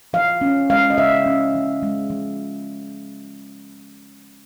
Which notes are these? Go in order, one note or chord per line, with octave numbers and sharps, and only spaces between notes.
F3 F5
C#4
G#3 F5
D#5
C#3 E5
C#4
F3
G#3
F3